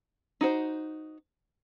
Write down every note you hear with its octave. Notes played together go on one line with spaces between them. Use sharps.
D#4 F#4 C5